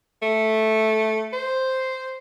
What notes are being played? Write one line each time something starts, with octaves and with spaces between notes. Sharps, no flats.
A3
C5